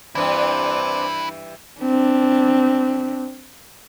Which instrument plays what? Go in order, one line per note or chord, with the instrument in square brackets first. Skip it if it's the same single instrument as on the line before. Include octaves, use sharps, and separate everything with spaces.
[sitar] G2 E3 [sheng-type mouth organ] C4 D4 [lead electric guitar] E4 B4
[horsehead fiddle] C4 D4